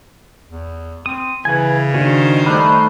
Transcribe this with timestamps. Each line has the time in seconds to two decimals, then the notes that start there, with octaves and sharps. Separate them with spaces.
0.51 E2
1.06 C4 D#6
1.45 C#3 E3 B4 G#5
1.94 D#3 D4 F#4 G#4 C5
2.46 G3 A3 D#4 B5 F#6